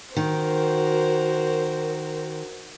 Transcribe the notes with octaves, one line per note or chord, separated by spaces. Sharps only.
D#3 F#4 A#4 C5